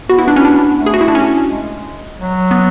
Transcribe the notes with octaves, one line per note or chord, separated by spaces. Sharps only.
B3 F#4
E4
D4
C#4
D4
B3
A3
G#4
F#4
E4
D4
C#4
G#3
F#3
B3